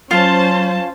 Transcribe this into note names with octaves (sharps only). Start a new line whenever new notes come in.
F#3 C#4 F4 C5 A5